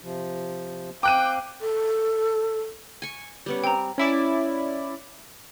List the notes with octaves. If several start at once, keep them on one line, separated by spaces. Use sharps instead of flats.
C3 F3
C4 F5 G5 D6 F#6 D#7
A4
G#5 C#6
G3 B3 C#4
C4 G5 A#5
C#4 E4 D5